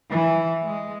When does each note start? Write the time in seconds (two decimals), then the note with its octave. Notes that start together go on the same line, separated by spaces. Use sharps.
0.11 E3
0.64 G#3